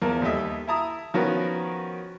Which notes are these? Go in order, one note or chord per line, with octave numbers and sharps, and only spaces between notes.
E2 F3 A#4 A5
D#2 G3 A4 D#5 E5 E6
E4 E5 A5 A#5 D#6
D#3 F3 B3 C#4 F#4 A#4